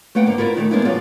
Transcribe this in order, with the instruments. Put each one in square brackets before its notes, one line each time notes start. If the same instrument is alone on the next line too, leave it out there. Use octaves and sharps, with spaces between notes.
[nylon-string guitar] A3 A#3 B4 F#5 G5
G#2 D3 A#3
E4 F4 A#4 C#5 D5
A#2 D#3 G#3 A3
G#3 A#3 B3 C#4 D4 E4
C#3 F3 F#3 G#3 F4 D5